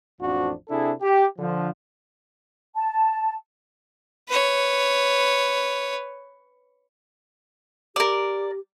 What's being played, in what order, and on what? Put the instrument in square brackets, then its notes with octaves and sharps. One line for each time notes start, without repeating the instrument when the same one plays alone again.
[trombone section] A1 F2 F3 D4 F#4
C3 D4 E4 G#4 A4
G4
D3 F3
[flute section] A5
[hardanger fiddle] B4 C#5
[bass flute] G4 [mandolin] A#4 D5